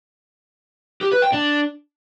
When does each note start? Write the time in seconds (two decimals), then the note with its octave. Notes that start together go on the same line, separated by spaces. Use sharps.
1.01 G4
1.12 B4
1.22 G5
1.33 D4